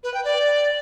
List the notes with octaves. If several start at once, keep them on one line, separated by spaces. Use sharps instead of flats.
B4
G5
D5